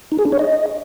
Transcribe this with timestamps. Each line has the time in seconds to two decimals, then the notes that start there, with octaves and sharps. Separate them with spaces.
0.12 D#4
0.19 G#4
0.25 D4
0.32 C#5
0.39 D#5